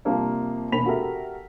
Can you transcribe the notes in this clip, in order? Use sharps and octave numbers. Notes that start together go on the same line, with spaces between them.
C3 F3 G3 A#3 D4
E1 D#2 B5 B6 F7
F#4 G4 A4 A#4 E5